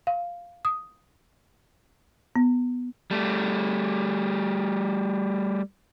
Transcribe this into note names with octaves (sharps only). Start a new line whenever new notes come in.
F5
D#6
B3
G3 A3